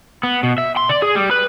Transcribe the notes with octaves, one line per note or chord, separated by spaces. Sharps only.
B3
B2
E5
C6
D5
G#4
G3
B4